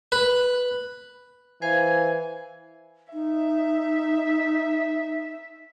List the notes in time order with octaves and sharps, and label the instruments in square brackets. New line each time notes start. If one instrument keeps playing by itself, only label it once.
[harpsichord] B4
[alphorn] E3 [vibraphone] C5 F5 [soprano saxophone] G#5
[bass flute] D#4 [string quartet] E5